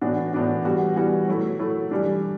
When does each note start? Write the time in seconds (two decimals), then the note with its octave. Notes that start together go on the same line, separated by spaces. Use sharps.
0.01 A2 E3 B3 D4 F#4
0.33 A2 E3 B3 D4 F#4
0.65 E3 G3 B3 F#4
0.96 E3 G3 B3 F#4
1.28 F#3 A3 E4
1.59 F#3 A3 E4
1.91 E3 G3 D4